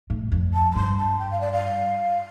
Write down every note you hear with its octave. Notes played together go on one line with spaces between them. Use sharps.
A2
F2
A5
A5
G2 C6
A5
G5
F5
D5
F5